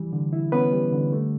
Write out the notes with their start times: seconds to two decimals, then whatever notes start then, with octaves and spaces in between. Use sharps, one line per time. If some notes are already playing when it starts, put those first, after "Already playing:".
Already playing: E3 G3
0.13 D3
0.33 E4
0.52 B3 C#4 B4
0.73 G3
0.92 D3
1.13 A3